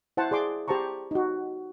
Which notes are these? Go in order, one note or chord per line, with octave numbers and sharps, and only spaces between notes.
E4 C5 F#5 A5
G#4 D5 C6 D6
G4 C5 A5 A#5 C#6
D#4 F#4